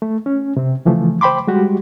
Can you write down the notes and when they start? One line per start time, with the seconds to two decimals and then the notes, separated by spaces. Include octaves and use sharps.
0.02 A3
0.26 C#4
0.57 C3 C4
0.85 C#3 E3 F3 A3
1.21 C5 G5 B5 C6 D6
1.47 G3 G#3 F#4 G4